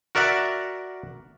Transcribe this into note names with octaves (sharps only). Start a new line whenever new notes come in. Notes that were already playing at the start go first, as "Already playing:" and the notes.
F#4 A#4 D5 E5 F#5